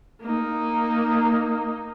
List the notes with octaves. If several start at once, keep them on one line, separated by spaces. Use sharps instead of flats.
A#3 D#4